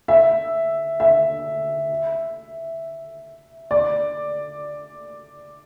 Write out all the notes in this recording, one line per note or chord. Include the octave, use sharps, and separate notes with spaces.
E5
E5
D5